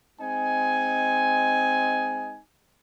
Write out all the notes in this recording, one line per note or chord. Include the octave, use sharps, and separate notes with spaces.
G#3 C4 D#4 G#5